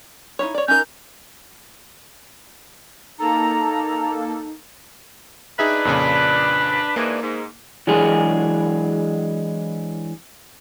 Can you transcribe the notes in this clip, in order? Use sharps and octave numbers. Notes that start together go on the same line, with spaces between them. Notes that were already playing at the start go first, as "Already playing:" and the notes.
D#4 E4 C#5
C#5 D5
C#4 D#4 A#4 G6
A#3 D#4 A4 A#5
D4 D#4 G#4 B4 E5
F2 A#2 C#3
G#2 E3 A#3 D4
G#2
E3 F#3 G#3 D4 G#4